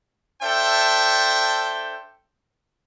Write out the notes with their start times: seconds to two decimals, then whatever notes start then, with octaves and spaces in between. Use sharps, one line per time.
0.42 D4 A4 C5 E5 G5